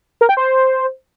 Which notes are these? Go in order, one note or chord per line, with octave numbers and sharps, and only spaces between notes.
A#4
G5
C5